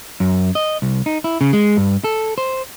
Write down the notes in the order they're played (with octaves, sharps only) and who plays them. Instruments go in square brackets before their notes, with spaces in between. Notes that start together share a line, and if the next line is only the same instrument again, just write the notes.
[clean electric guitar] F#2
D#5
C2
D#4
E4
C#3
G#3
G2
A4
C5